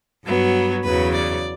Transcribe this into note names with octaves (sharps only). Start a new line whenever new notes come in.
G2 F#3 B3
E2 C#3 F#3 B4
D5